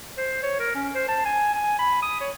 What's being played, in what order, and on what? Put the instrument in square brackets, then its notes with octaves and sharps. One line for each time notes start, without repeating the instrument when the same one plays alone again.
[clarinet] C5
C#5
A#4
C#4
C5
A5
G#5
G#5
B5
D#6
C#5